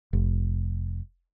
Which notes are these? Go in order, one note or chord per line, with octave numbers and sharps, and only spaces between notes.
F1